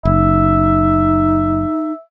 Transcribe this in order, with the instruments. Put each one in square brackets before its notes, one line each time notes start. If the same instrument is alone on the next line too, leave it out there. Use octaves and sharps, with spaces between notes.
[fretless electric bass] F#1 [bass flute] D#4 [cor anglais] E5